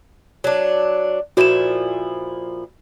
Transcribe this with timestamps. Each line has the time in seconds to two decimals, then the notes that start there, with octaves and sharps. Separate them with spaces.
0.44 F#3 D4
1.37 A#2 F3 E4 F#4 E7